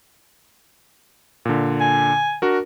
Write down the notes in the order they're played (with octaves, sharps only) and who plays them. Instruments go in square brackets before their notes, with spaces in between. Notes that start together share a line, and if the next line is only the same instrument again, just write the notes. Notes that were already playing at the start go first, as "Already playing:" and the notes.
[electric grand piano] A#2 D3
[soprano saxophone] G#5
[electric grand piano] D4 F#4 A#4